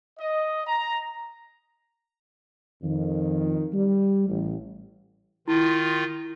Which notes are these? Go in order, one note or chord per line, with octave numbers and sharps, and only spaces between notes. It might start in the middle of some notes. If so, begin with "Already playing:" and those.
D#5
A#5
F2 D#3
G3
A1
D#3 E4 F4